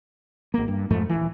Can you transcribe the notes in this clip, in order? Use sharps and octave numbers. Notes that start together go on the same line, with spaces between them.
G#1 A#3
G2
F2 G#2 F3 A3
D#1 E3